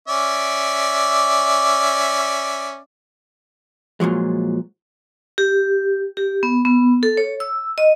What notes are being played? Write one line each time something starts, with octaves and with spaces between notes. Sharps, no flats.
C#4 D5 E5
A#2 F3 F#3 G#3
G4
G4
B3
B3
A4
C#5
E6
D#5